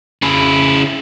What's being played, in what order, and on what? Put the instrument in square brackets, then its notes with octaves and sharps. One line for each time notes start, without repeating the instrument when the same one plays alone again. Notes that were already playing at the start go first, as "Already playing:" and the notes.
[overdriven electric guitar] C#3 E4